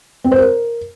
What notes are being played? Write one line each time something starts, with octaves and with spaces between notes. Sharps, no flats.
C4
C5
A#4